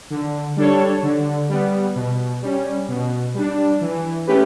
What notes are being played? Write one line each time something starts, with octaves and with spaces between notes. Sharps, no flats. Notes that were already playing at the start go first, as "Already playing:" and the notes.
D3
G3 D4 A4 C#5
D3
G3 B3
B2
G3 C#4
B2
G3 D4
E3
A3 C#4 G4 B4